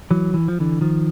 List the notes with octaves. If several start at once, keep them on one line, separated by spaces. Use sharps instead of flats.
E3 F#3
E3
F3
D3 E3
D#3 F3